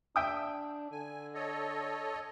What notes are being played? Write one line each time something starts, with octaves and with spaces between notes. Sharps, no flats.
D4 E5 G5 D#6
D3 G#5
A4 C#5 D#5